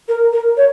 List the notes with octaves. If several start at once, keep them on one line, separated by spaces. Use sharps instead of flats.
A#4
A#4
C#5